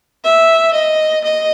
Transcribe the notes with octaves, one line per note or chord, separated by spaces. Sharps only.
E5
D#5
D#5